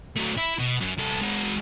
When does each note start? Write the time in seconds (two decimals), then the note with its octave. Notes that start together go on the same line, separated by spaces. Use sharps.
0.16 F#3 A3
0.37 E4
0.58 B2
0.80 F#2
0.98 C2 A4
1.21 G#3 F#4